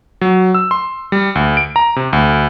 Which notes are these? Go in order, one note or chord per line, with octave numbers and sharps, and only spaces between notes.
F#3
E6
C6
G3
D2
D7
A#5
C3
D2